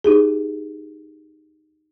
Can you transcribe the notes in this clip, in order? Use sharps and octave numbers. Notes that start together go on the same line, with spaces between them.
D#4 G4 G#4